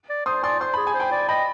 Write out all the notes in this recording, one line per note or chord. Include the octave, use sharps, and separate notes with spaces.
D5
C5 C6 D#6
D5 G#5 C6
C5 C6
G#4 B5
G#5
C5
G5 B5
D5
D#5 G5 B5